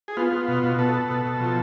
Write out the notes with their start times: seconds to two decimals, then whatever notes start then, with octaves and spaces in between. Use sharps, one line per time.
0.08 G#4
0.17 B3 F4
0.32 B3
0.48 B2
0.63 B2
0.79 B3 A4
0.94 B3
1.10 B2
1.25 B2
1.40 F3